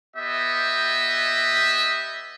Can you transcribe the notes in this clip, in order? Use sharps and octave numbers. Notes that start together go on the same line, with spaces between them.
B3 G4 D#5 E5